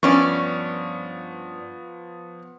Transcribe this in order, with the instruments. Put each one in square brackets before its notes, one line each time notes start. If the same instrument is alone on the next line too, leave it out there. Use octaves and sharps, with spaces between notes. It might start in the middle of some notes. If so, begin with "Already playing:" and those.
[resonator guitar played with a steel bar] G2 C#4 D5 [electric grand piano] F3 B3 C#6